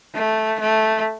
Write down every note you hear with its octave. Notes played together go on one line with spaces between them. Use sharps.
A3
A3